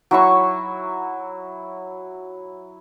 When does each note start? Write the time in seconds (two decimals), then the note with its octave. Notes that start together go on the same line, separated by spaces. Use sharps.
0.11 F#3 E4 C#6